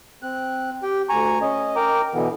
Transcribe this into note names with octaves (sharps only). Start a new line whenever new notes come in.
C4 F#6
G4 G5
D2 G#5 A#5 C#6
C#4 D#5
A#4 G5 A#5 D6
B2 D3 E3 B3